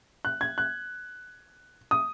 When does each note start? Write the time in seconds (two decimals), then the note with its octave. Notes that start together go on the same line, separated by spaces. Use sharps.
0.25 F#6
0.41 G#6
0.58 F#6
1.91 D#6